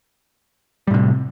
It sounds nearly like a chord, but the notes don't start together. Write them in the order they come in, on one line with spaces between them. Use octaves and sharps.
G3 A2 C3